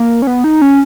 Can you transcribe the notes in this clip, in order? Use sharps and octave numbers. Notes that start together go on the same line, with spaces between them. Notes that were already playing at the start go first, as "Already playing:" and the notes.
Already playing: A#3
C#4
B3
D#4
C#4